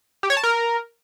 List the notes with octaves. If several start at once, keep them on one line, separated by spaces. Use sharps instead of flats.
G4
C#5
A5
A#4